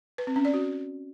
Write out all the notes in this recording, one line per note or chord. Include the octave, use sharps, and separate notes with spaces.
B4
C4
C#4
D5
F#4